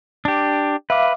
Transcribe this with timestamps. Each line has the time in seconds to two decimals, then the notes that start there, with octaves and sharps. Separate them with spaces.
0.25 D4 G4
0.90 B4 E5 F5 D6